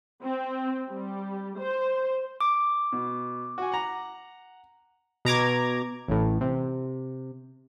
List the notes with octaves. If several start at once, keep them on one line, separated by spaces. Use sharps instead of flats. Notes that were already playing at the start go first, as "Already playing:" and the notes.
C4
G3
C5
D6
B2
F#4 G#5
F#5 A#5
B2 A#5 D6 G#6
A1 A2
C3